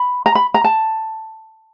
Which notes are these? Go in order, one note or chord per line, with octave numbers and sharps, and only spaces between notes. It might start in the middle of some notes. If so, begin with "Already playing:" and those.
Already playing: B5
A#5
B5
A#5
A5